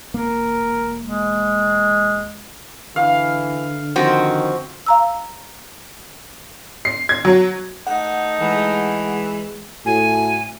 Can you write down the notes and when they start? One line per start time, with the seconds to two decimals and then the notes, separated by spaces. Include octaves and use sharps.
0.14 E1 A#3 A#4
1.02 G#3
2.96 D3 E3 F5
3.96 D#3 F3 C4 F#4
4.86 F5 A#5 E6
6.85 C7
7.09 G#6
7.25 F#3
7.87 A3 D#4 F#5
8.41 E3 G#3
9.86 A2 F#4 G#5